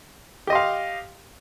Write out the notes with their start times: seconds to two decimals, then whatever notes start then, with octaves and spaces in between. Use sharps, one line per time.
0.47 G4
0.50 D#5
0.53 C6
0.55 F5